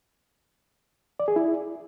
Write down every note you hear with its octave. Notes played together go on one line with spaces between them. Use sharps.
D5
G#4
E4